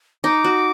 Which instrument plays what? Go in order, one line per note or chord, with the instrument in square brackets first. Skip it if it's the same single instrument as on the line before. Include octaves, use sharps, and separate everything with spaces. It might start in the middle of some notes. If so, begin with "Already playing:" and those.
[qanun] D#4 [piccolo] D6
[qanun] F#4